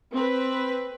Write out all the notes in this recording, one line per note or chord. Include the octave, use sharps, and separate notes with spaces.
C4 B4